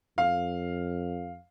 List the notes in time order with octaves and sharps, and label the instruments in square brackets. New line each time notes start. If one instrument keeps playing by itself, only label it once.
[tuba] F2 [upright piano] F5